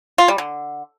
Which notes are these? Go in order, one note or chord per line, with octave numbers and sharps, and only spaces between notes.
F4
G3
D3